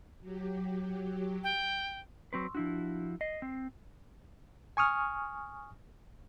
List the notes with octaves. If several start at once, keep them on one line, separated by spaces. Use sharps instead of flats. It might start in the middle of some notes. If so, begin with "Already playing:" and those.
F#3 G4
G5
F#3 C4 B4 C6 C#6 E6
F3 D4 E4 F#4
D#5 C7
C4
G#5 C#6 D#6 F6